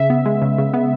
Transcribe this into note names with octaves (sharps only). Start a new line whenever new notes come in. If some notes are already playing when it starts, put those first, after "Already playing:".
Already playing: C#3 E5
B3
G#3
C#3
C#3
B3